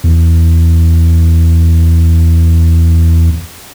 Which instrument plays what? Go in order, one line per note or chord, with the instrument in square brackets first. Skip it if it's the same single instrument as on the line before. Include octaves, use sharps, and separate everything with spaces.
[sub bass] E2